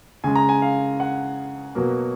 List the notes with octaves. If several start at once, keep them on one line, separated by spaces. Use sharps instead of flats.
C#3 G#3 G#5
A#5
G#5
F5
F#5
B2 F#3 A#3